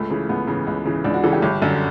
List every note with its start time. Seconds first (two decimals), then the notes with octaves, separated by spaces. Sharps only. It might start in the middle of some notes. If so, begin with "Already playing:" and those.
Already playing: C#2 A3
0.10 C#3 E3
0.29 C#2 B3
0.48 C#3 E3
0.67 C#2
0.86 C#3 E3
1.04 C#2 D4
1.14 F#4
1.24 C#3 E3 A4
1.33 G4
1.42 G1
1.62 F#2 D3